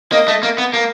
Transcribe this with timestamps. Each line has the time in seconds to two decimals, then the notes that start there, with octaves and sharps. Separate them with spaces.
0.12 A#3 D#5
0.28 A3
0.43 A#3
0.58 B3
0.74 A#3